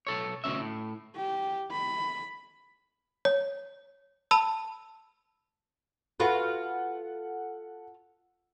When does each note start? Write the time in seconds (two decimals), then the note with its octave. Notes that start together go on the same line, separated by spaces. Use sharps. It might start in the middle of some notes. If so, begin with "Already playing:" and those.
0.07 B1 A4 C#5
0.44 D2 B2 D#3 C#4 E5
0.60 A2
1.15 G4
1.71 B5
3.25 C#5
4.31 A5 B5 E6
6.20 F4 F#4 A4 B4 F#5